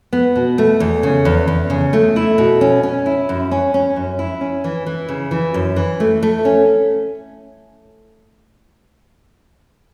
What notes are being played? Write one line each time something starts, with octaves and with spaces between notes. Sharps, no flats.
B3
B2
A3
E2
C#3
E2
E2
C#3
A3
E4
B2
C#4
C#4
E4
F#2
C#4
C#4
F#2
E4
C#4
E3
E3
C#3
E3
F#2
E3
A3
A3
C#4